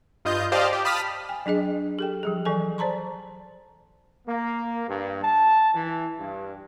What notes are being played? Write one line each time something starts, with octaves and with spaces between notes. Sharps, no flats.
G2 F4 D#5 G6
G4 C5 D5 D#5 F5 A5
G4
A5 B5 D#6 F6 B6
G5 G#5
F#3 D4 G#4 D#5
G4 A4 G5
F3 G3 G#4
E3 F#3 A4 G#5
C5 D5 A5 A#5 C6
A#3
G2
A5
E3
G2